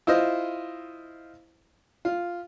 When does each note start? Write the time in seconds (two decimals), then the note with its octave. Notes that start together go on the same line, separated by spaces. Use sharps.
0.07 E4 F4 C5 D#5
2.05 F4